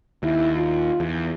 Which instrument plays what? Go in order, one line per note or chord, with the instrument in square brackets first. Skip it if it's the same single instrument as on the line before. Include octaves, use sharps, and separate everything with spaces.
[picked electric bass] D#2 [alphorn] E4
[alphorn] F4
[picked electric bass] E2